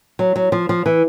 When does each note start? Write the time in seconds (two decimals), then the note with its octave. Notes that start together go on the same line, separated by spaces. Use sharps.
0.19 F#3
0.36 F#3
0.52 F3
0.69 F3
0.86 E3